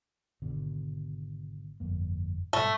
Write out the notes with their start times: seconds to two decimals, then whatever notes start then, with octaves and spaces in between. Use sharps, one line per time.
0.42 G#1 B2 D3
1.80 G1 F2 A#3
2.53 G#2 B2 G3 A3